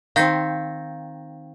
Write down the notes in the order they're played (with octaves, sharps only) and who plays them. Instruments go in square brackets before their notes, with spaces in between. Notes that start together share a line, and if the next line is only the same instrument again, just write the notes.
[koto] D#3 C4 [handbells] F5 G6 A#6